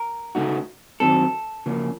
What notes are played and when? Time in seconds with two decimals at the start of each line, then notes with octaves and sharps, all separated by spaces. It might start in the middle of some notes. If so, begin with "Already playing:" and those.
Already playing: A#4
0.35 C#3 A3 D#4 F#4
1.00 F#2 D#3 F#3 C4 A4
1.66 C#3 F3 A#3